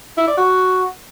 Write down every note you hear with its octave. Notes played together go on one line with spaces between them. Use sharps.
E4
D5
F#4